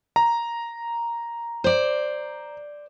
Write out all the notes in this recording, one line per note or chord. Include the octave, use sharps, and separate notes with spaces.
A#5
C5 D5